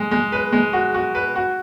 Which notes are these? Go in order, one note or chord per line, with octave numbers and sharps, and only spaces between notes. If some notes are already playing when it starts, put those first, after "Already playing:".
Already playing: G#3
G#3
B4
G#3
F#4
F#4
B4
F#4